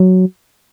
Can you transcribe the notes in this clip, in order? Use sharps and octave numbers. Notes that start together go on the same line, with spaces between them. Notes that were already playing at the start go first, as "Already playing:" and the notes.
Already playing: F#3